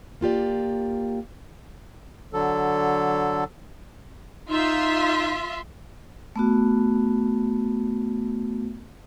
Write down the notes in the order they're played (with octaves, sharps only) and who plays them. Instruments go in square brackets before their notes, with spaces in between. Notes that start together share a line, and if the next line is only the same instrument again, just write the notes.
[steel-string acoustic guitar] A#3 F4 G4 D5
[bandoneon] D3 F#3 A4
[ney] D#4 [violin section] F4 E5 C6
[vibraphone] A3 B3 F#4